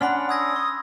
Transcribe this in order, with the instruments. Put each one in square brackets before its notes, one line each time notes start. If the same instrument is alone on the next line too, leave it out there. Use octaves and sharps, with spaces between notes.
[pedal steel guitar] C#4 D4 [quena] F#5 [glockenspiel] B5 C6 F6
[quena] D#6 [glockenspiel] E6 G#6 A#6
[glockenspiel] C#6